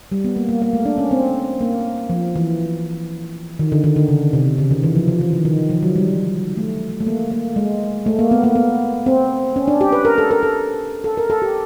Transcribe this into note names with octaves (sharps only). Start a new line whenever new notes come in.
G3
B3
A#3
A#3
A#3
A3
D4
C#4
C4
A#3
F3
E3
D#3
D3
D#3
D3
C#3
C3
C#3
D#3
E3
F3
F3
E3
D#3
D#3
F3
F#3
G3
A3
A3
A#3
A#3
G#3
A3
A#3
B3
A#3
B3
C4
C#4
D4
G4
B4
A#4
A4
A#4
A4
A4
A#4
A4
G4